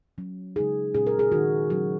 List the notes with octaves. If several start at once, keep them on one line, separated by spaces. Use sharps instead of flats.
F#3 C#4
C#3 G#3 D#4 G#4
A#2 G#3 C#4 G#4
A#4
G#4
D#3 F#3 D#4 F#4
F#3 C#4 F#4